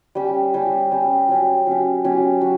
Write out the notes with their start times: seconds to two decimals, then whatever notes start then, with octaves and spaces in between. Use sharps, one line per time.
0.15 G3 C#4 G4
0.54 G3 C#4 G4
0.92 G3 C#4 G4
1.29 F#3 C#4 G4
1.67 F#3 C#4 G4
2.04 F#3 C#4 G4
2.41 F#3